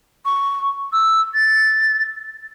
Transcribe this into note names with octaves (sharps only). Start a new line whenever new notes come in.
C#6
E6
A6